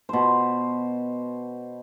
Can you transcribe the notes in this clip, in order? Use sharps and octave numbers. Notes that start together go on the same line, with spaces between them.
B2 C5